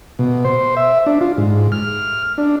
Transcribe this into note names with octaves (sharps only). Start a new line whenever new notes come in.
B2
C5
E5
D4
F4
G#2
F6
D4